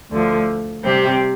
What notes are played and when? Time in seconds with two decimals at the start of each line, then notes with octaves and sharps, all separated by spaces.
0.10 D2 D3 F3
0.84 C3 G3 C4 G4